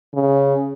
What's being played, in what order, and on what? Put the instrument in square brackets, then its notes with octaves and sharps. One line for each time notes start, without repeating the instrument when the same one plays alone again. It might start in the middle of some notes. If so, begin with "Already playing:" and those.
[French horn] C#3